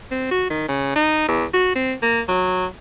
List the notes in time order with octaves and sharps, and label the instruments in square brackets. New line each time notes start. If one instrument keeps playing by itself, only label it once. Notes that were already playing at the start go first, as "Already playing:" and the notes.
[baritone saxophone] C4
F#4
D#3
C#3
D#4
E2
F#4
C4
A#3
F#3